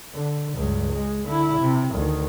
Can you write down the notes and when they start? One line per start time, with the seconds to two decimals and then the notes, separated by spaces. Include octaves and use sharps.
0.15 D3
0.55 C#2 G2
0.94 G#3
1.26 D3 E4
1.61 C3
1.95 D2 D#3